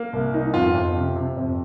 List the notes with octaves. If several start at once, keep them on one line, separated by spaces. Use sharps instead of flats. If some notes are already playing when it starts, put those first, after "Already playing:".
Already playing: A#3
C2
D#4
F2 F4
F2
C3
C3
F2